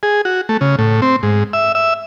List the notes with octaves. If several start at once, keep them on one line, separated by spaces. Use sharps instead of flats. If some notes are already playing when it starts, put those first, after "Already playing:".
G#4
F#4
A3
C#3
A2
C4
G#2
E5
E5